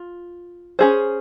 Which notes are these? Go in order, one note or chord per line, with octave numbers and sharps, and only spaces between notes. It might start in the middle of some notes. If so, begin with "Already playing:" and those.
Already playing: F4
C#4 G#4 C5